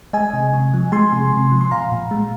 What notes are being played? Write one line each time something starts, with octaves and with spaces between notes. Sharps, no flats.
G#3 D#5 G#5
C3
C3
F3
G#3 G#5 C6
C3
C3
F3
C6
A#2 F5 A#5
A#2
G#3